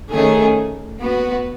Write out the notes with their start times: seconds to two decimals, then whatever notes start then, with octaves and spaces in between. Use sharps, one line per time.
0.12 D#3 A3 C#4 G#4
1.01 B3 F#4 B4